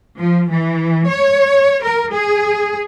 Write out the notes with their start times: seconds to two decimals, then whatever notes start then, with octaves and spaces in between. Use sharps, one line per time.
0.18 F3
0.50 E3
1.07 C#5
1.83 A#4
2.12 G#4